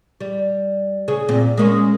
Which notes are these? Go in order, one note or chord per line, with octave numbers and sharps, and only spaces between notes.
G3
C#3 G#4
A#2 C4
G#3 A#3 C#4